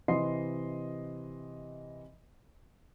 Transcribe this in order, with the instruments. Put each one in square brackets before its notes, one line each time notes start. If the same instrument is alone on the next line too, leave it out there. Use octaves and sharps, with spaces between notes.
[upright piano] C3 E3 D#5 C6 C7